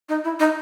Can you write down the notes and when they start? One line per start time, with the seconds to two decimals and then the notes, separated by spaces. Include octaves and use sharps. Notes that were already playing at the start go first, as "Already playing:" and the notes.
0.09 D#4
0.24 E4
0.40 D#4